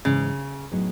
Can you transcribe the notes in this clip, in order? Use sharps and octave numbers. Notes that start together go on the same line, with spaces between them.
G#2 C#3 E3 G#3
A2 F#3 B3 D#4 G#4